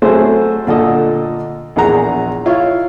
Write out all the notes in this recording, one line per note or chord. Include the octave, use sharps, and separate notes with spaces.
F#3 A3 C4 G#4 A4 C5
A#2 D3 A4 D#5
A#1 E2 G#4 F#5 A#5
E4 F4 C#5 F5